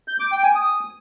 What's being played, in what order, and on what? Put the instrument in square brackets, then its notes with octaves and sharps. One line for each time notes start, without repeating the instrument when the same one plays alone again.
[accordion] G6
D6
G5
G#5
D#6